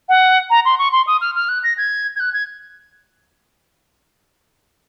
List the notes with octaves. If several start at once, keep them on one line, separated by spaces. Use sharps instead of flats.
F#5
A#5
C6
C#6
C6
D#6
F6
F6
F#6
A#6
G#6
G#6
F#6
G#6